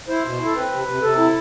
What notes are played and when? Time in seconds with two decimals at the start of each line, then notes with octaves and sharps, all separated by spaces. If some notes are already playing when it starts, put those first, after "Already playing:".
0.08 E4 C5
0.24 B2
0.39 E4
0.45 A4
0.55 C4 B4
0.71 C3
0.87 C3
1.02 C3 A4
1.18 E4